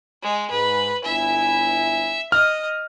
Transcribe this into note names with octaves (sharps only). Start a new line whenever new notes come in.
G#3
G#2 B4
G1 E4 E5 G#5
D#5 F6